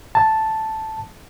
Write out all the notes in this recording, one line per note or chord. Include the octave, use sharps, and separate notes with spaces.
A5